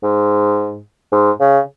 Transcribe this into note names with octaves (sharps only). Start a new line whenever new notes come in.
G#2
G#2
C#3